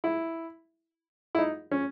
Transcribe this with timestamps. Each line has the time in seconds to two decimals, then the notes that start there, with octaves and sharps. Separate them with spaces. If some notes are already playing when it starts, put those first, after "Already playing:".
0.04 E4
1.35 E4
1.39 D#4
1.71 C#4